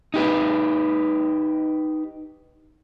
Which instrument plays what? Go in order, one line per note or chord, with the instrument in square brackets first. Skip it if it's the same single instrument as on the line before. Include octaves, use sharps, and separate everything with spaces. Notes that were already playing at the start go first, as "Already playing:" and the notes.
[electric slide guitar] D#4 G4 B4